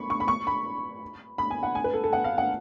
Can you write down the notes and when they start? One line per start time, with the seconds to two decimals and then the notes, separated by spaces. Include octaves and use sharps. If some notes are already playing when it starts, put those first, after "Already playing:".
Already playing: B5 C#6
0.10 C#6
0.20 B5
0.28 C#6
0.47 B5
1.38 B5
1.51 G#5
1.63 F#5
1.75 G#5
1.84 B4
1.94 A4
2.04 A4
2.13 F#5
2.24 F5
2.38 F#5